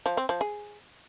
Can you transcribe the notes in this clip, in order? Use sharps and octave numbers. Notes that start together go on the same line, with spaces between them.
F3
C4
F3
G#4